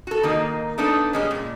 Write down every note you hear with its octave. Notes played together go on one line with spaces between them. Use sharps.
F#4 A4
D#3 A#3 D#4
A3 B3 D4 D#4 B4
G2 G#3 C#4
A#2